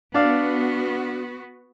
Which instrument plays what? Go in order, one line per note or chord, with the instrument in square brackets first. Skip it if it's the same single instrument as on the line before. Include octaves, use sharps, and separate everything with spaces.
[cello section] B3 F#4 [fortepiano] D4 D5 F5